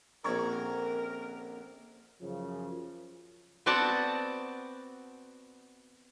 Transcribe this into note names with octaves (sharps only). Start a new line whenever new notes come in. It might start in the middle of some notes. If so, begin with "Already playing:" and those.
A#1 D3 C4 C#4 A#4 A#5 C#6 G#6
F#2 C#3 F3
B3 C4 F#4 D5 F#5 A5